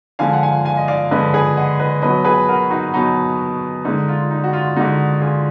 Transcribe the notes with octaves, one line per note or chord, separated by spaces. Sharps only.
D3 F3 G#3 F5 G#5
F#5
F5 G#5
F5 G#5
D#5
D5 F5
D3 F3 G#3 B4 D#5
G#4 B4
D#5 F#5
B4 D#5
B2 F#3 B4 D#5
G#4 B4
F#4 A#4
D#4 F#4
B2 F#3 D#4 F#4
D3 G#3 D#4
F4
D#4
F#4
F4
D3 G#3 D#4 F#4
F4 G#4